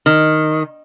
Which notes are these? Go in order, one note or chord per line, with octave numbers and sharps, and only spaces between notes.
D#3